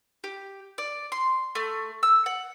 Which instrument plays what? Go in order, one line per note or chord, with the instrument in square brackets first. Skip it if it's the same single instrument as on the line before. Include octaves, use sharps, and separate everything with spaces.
[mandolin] G4
D5
C6
A3
E6
F#5